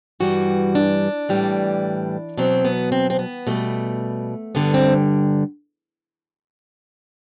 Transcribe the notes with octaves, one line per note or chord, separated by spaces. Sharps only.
G2 E3 G3 F#4
D4
A2 E3 G3
B2 F#3 C4
B3
C4
C4
B3
B2 G3 A3
G2 D3 G3 B3
C4